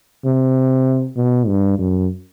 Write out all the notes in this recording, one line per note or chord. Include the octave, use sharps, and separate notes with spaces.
C3
B2
G2
F#2